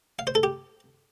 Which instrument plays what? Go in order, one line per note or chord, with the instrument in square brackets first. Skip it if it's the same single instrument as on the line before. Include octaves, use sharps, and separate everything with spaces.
[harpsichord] F5
C5
A4
G4